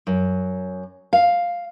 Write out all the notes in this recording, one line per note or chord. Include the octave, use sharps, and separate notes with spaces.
F#2
F5